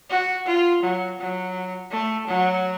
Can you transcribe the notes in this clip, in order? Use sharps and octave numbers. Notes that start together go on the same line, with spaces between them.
F#4
F4
F#3
F#3
A3
F#3